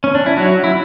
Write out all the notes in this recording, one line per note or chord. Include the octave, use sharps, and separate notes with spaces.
C#4
D4
E4
F#3 F#4
E4